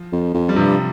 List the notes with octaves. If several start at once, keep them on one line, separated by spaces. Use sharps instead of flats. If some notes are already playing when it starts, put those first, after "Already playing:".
Already playing: F3
F2
F2
G3
G2 C3 F3